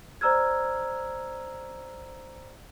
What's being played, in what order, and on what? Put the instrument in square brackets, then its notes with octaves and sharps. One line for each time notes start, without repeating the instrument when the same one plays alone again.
[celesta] C5 D5 A#5 E6 F6 G#6